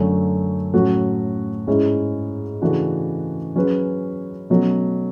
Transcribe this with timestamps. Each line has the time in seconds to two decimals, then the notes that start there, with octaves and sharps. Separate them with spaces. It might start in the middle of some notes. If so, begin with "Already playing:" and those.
Already playing: F#2 D3 F#3 A3
0.74 A2 F#3 C#4 F#4 A4
1.67 G#2 G#3 C#4 E4
2.62 C#3 E3 A3 D4 F#4
3.56 F#3 C#4 G#4 B4
4.50 B2 F#3 A3 C#4